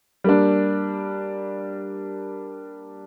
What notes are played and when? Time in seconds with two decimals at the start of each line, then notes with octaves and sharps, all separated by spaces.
0.24 G3 A#3 D4